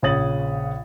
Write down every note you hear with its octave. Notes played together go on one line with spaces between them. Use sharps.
A#1 C#3 C#5 D#6 A6 F#7